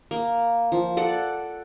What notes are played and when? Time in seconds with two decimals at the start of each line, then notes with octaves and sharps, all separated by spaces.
0.11 A#3
0.72 F3
0.97 A4 D5 F#5